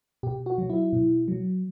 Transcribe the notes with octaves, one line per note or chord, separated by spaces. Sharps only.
B2 G4
F#4
F#3
E4
B2
F#3